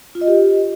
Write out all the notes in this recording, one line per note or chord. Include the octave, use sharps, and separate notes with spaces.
F4
D#5
G4